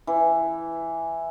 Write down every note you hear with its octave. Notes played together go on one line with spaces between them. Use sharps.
E3